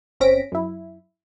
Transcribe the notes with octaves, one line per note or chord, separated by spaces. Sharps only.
G1 C4 C#4 A#6 B6 D7
F#2 E4